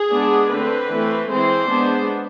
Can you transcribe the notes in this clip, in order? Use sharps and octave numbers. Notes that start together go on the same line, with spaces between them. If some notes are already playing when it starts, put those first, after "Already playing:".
Already playing: G#4
G#3 B3 D4
D3 A3 C4 B4
E3 A3 C4
E3 G#3 C4 C5
G#3 B3 D4